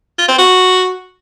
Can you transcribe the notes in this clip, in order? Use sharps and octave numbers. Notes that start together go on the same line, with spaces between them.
F4
C4
F#4